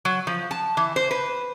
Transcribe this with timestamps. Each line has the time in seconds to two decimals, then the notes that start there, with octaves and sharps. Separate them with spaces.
0.05 F#3
0.27 F3
0.51 A5
0.77 E3
0.96 C5
1.11 B4